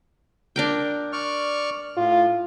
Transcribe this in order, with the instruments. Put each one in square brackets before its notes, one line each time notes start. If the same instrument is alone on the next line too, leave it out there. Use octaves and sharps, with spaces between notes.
[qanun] D4 A#4 G5
[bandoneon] D5 C#6 F6
[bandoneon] A2 [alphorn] F4